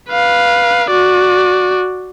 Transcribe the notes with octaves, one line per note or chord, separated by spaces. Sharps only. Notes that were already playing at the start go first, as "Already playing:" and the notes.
B4 F5
F#4 D5